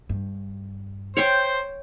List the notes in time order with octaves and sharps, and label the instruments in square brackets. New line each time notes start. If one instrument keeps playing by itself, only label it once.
[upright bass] G2
[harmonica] C5 [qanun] C#5 G5 C6